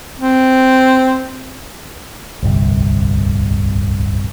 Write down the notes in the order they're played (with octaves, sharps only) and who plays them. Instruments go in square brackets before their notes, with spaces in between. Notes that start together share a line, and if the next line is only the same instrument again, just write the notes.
[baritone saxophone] C4
[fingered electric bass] D1 G1 C2